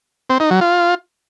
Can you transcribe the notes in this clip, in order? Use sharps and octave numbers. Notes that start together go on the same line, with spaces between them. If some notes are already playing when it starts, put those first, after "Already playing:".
C4
D#4
F#3
F4